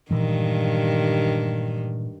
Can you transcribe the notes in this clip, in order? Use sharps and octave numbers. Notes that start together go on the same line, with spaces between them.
G2 A#2 D#3 E3 G#3